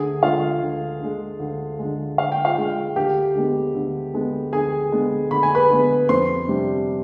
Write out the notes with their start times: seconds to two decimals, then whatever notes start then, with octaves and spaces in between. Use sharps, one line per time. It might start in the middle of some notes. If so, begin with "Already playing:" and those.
Already playing: D2 G#4 G#5
0.22 D3 G#3 F4 F5
0.62 D2
1.01 D3 G#3
1.40 D2
1.79 D3 G#3
2.18 D2 F5
2.32 G5
2.45 F4 F5
2.57 D3 G#3
2.96 D2 G4 G5
3.35 D3 G#3 B3
3.75 D2
4.14 D3 G#3 B3
4.53 D2 G#4 G#5
4.92 D3 G#3 B3
5.31 D2 B5
5.43 G#5
5.55 B4 B5
5.70 D3 G#3 B3
6.09 F2 C5 C6
6.48 C3 G3 D4